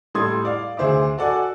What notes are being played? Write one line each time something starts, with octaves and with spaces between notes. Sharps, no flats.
A2 G3 A4 C6 D#6 G#6
D5 F5
D2 G#4 C5 E5 D6
F#4 A4 D5 F#5 G#5